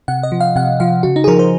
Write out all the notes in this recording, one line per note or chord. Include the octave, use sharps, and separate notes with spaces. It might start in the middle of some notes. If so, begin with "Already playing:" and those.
C3 F#5
D#5
F3
F5
C3 F#5
F3 F5
C#3 F#4
D#4
G#4
F3 A#4
C5